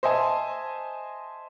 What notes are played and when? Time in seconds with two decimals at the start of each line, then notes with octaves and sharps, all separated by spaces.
0.03 C5 D#5 E5 G#5 A5 C6